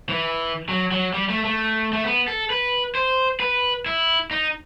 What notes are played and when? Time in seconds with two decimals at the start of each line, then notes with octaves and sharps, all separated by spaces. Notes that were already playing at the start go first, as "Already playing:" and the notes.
0.09 E3
0.69 F#3
0.92 F#3
1.14 G3
1.30 A3
1.45 A3
1.93 A3
2.04 B3
2.28 A4
2.50 B4
2.95 C5
3.40 B4
3.86 E4
4.31 D#4